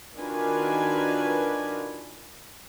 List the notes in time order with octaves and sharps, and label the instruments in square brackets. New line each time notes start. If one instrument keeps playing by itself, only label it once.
[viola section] D#3 D4 F4 F#4 B4 G#5